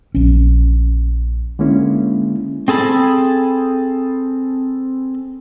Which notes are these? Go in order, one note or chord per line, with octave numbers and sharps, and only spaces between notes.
A#1 C#4
D3 G#3 A#3 C#4 E4
C4 G#4 A4 B5